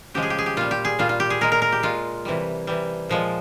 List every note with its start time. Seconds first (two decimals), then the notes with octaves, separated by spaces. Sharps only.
0.14 C#3 F3 G#3 G4
0.23 G#4
0.30 G4
0.38 G#4
0.46 G4
0.57 A#2 G3 F4
0.71 G4
0.85 G#4
0.99 A#2 G3 F4
1.09 F4
1.20 G4
1.30 G#4
1.41 A#2 G#3 A#4
1.52 A#4
1.62 A#4
1.72 G4
1.83 A#2 G#3 F4
2.25 C3 E3 G3
2.67 C3 E3 G3
3.09 A#2 F3 G#3